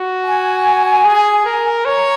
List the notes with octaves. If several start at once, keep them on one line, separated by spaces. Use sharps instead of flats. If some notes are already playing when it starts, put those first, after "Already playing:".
Already playing: F#4
G#5
G#4
A#4
C#5 A#5